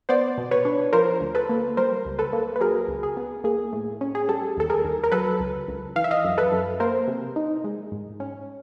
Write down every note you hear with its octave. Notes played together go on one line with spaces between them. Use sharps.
B3 C5 D5
B2
B4 C#5
D4
F3 A#4 C5
D2
A4 B4
A#3
G3 A#4 C5
C#2
A4 B4
A#3
B4
F#3 G#4 A#4
C#2
G#4
B3
A#3 G#4
A2
C#4
G#4
G3 A4
D#2 A4
G#4 A#4
D#2
A#4
F#3 A4 B4
C#2
C#2
E3 F5
E5
D#5 F5
F#2
A4 B4
F#2
A#3 A#4 C5
C3
D#4
G#3
G#2
C#4